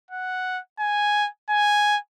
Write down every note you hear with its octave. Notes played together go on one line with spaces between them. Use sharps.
F#5
G#5
G#5